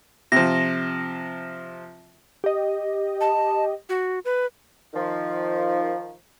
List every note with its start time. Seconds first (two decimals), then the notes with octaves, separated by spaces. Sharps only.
0.32 C3 F3 A#6
2.44 G4 D#5
3.21 A5
3.89 F#4
4.25 B4
4.94 D#3 F3